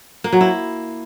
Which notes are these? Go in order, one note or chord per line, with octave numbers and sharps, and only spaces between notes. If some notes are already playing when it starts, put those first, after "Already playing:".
A#3
F#3
E4